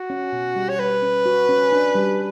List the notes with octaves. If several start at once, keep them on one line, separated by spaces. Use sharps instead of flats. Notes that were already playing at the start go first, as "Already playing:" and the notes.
Already playing: F#4
C#4
B2
G3
C#5
G3 B4
C#4
F#4
C#4
D4
G3